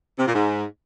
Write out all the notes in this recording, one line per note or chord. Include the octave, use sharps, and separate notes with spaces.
C3
A#2
G#2